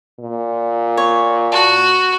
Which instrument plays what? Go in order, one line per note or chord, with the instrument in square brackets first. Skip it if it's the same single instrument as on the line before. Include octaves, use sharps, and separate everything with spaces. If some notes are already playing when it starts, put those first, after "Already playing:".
[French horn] A#2
[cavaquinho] C#5
[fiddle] F#4 [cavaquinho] A5